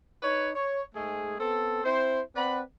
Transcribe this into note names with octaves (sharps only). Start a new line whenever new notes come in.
D#4 B4 C#5
C#5
G#2 G#3 A3 G#4
B3 C4 A4
C4 E4 C5
C4 B4 D5 F#5 B5